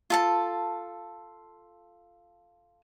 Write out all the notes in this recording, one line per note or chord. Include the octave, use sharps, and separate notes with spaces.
F4 A4 A5